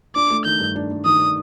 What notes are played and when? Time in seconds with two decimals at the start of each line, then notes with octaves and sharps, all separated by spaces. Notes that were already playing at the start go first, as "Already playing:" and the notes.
0.16 D4 D6
0.31 A3
0.45 D#3 G6
0.60 G2
0.76 D4
0.91 A3
1.05 D#3 D#6